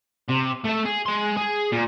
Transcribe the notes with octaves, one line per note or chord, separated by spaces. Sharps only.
C3
A3 E5
G#4
G#3 C6
G#4
A#2